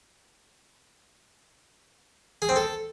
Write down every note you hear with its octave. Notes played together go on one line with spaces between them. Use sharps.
G#4
C4
A4